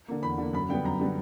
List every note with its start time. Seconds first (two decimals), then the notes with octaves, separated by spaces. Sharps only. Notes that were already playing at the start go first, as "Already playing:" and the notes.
0.08 D3 A#3
0.23 E2 B5
0.38 D3 A#3
0.53 F#2 B5
0.69 D3 G3 B3 G5
0.84 F#2 A#5
1.00 D3 G3 B3